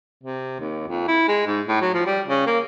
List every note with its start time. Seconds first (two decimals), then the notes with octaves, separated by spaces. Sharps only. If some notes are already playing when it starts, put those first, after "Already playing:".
0.23 C3
0.60 D#2
0.88 F2
1.08 E4
1.28 G#3
1.47 G#2
1.68 A2
1.81 F#3
1.94 F3
2.06 G3
2.27 C#3
2.47 A#3